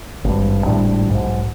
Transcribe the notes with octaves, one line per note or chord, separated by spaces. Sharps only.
G#1 G2
G#1 A2 G3 D4
B1 G#2